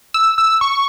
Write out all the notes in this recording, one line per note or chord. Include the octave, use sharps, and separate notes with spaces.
E6
E6
C#6